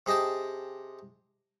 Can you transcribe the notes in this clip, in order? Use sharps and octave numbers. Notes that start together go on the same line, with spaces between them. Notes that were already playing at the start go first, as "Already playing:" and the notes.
C3 G#4 D#5 G5 A5